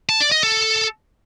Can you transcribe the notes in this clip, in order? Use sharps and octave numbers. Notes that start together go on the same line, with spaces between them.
A5
D5
D#5
A4